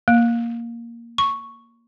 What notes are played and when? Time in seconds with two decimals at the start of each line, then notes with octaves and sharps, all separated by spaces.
0.08 A#3
1.18 C#6